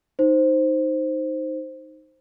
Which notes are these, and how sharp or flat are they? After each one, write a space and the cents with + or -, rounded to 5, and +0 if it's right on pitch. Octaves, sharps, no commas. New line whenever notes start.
D#4 +0 C5 +0